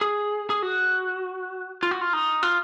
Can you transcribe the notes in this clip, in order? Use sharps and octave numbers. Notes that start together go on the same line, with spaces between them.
G#4
G#4
F#4
F4
F#4
F4
D#4
F4